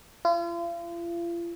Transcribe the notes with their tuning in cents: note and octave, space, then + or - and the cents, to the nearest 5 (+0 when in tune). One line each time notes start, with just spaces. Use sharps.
F4 -40